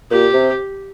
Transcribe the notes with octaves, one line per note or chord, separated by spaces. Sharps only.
A#2 G4
C3